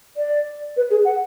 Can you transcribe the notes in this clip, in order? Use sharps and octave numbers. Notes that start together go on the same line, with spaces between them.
D5
B4
G#4
F#5